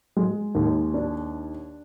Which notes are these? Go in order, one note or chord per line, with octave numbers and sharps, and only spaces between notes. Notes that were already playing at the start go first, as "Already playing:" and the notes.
G#3
D#2
D4